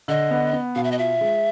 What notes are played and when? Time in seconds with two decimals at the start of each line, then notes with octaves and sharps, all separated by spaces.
0.08 D3 D#5
0.31 B3
0.53 B3
0.76 B2 F5
0.84 E5
0.92 D#5
0.99 F4 E5
1.21 G#3